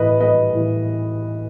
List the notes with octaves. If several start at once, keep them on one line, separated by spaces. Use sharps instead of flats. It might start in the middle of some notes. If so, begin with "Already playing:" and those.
Already playing: A2 E3 B4 D#5
B4 D#5
A2 E3